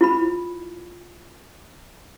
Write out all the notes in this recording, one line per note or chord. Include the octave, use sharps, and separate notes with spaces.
E4 F4 B5